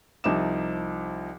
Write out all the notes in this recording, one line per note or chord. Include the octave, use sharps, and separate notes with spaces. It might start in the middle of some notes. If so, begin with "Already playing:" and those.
C2 F3 D#4 E5 D6 E7